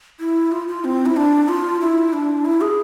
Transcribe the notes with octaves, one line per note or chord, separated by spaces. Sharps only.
E4
F4
F4
C4
E4
D4
F4
E4
D4
E4
G#4